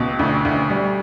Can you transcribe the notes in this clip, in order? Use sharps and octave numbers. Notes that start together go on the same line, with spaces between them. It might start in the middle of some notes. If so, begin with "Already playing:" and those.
Already playing: C#2 B2
D2
D2
G3